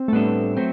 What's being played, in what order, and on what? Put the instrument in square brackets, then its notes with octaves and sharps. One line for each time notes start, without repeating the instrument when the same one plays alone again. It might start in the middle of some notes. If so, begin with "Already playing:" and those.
Already playing: [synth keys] C4
A3
[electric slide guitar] A2 G3 D4 A4 [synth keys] B3
[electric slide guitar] F#3 A3 [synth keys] C4